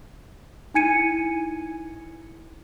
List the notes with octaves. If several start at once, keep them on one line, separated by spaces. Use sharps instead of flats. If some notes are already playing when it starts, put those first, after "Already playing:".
D#4 E4 G#5 G#6 C#7 D#7